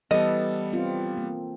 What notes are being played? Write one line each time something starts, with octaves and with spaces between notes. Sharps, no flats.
E3 G3 B3 A4 D#5
C4 F4
A#3